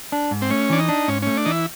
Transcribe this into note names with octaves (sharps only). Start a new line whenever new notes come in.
D4
G#2
C4
A3 C#4
E3 D4
D#4
D4
G#2 C#4
A3 C#4
D4
E3 D#4
E4